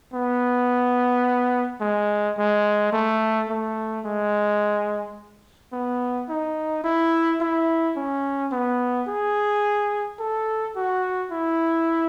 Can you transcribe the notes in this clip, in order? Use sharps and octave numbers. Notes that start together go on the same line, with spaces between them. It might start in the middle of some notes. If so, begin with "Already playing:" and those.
B3
G#3
G#3
A3
A3
G#3
B3
D#4
E4
E4
C#4
B3
G#4
A4
F#4
E4